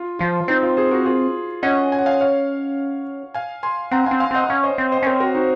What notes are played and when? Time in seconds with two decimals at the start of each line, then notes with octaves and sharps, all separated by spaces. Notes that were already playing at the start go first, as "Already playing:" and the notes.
Already playing: F4
0.19 F3 F4
0.48 C4 D#4
0.63 F4
0.77 G#4 C5
0.91 F#4 A#4
1.05 F4 G#4
1.63 C#4 D#5 F#5
1.92 G#5
1.99 F#5
2.06 F5 G#5
2.21 C#5 F5
3.34 F5 G#5
3.63 G#5 C6
3.91 C4 F#5 A#5
4.06 F5 G#5
4.11 C4
4.20 F5 G#5
4.31 C4 D#5 F#5
4.49 C#4 C#5 F5
4.63 C5 D#5
4.78 C4
4.92 C5 D#5
5.03 C#4
5.06 C4 A#4 C#5
5.20 F#4 A#4
5.35 D#4 F#4